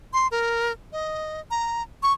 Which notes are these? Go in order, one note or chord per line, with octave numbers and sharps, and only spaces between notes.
C6
A#4
D#5
A#5
C#6